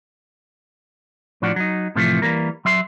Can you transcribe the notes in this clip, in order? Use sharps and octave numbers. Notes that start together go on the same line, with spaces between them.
A2 F3 D4 F#4
F#3 D#4
A2 C3 E3 F3 A3
E3 G3 A#3 A#4
F#3 E5 C6